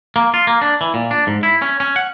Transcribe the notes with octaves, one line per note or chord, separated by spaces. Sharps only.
A#3
F4
A#3
D4
E3
A#2
D4
G#2
E4
C#4
C#4
F#5